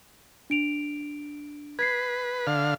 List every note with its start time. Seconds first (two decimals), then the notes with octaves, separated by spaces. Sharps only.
0.50 D4 D7 F7
1.79 B4 G#6 B6 C7
2.47 D3 F5